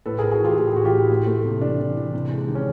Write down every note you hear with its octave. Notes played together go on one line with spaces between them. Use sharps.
A2 A4 B4
G#4 A#4
A2
F#4 G#4
E3 F4 G4
A2 G#4
G4
E3 F#4
F4 G4
A2
A3
A3
C3
E3 D4
E3
E3
C3
G#3
D#3
C#4